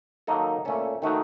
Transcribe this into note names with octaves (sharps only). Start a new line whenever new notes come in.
D#3 F#3 A#3 D#4 A4
A#2 A3 C#4 A4
D#3 A3 D#4 F#4